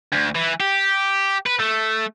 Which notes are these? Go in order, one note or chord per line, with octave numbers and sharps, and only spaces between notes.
D2
E3
G4
B4
A3